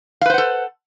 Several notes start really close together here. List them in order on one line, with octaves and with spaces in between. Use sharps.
F5 B4 C5 F#5 A4